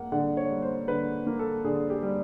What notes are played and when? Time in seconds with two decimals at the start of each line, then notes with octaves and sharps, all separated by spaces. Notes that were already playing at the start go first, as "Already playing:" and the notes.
Already playing: A#3 F#5
0.12 D3 F#5
0.37 C#5
0.50 G3
0.62 C5
0.88 D3 B4
1.27 A#3
1.39 A4
1.65 D3 G#4
1.90 G4
2.02 G3